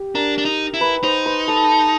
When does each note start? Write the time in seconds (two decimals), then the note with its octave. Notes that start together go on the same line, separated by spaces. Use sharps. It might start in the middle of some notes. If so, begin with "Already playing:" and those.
Already playing: G4
0.15 D4 A#4
0.38 D4
0.45 D#4
0.74 E4
0.81 B4
1.03 D#4 C5
1.26 B4
1.48 A4